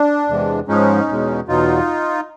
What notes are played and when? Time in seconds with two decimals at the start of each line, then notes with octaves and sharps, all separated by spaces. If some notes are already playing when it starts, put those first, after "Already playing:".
Already playing: D4
0.28 E2 C3 E3 G#3
0.68 G#2 F3 G#3 C#4 D#4
1.08 E2 B2 G#3
1.48 E2 B2 F#3 D#4 F4